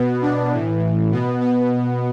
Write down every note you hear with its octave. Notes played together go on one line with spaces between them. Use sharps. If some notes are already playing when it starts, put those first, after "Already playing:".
Already playing: B2 B3
D4
A2 E3
B2 B3
B3